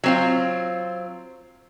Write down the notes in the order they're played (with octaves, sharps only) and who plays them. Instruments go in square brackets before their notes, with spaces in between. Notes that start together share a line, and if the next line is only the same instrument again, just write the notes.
[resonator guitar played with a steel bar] F#3 C4 F4